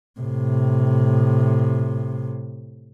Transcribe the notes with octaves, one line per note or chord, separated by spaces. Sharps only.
A2 C3